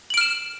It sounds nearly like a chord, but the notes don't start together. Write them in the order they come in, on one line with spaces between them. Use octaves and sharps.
F#7 D7 F6 E7